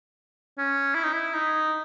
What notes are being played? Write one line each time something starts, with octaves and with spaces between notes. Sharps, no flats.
C#4
E4
D#4
E4
D#4